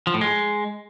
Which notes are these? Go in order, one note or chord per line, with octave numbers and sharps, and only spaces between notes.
F3
A2
G#3